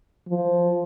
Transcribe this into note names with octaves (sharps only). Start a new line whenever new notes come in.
F3